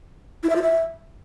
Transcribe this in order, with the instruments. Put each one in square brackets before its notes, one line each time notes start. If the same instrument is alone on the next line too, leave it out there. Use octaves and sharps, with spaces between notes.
[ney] E4
E5
F4
E5